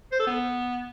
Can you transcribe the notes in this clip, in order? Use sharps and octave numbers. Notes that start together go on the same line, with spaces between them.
C5
A4
B3